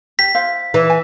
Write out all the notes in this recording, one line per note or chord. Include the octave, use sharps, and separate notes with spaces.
G4 B6
E4 C5 F5
E3
G#5